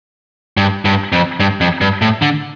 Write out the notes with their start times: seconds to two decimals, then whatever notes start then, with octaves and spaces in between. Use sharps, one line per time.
0.57 G2
0.85 G2
1.12 F2
1.40 G2
1.61 F2
1.81 G2
2.02 A2
2.22 D3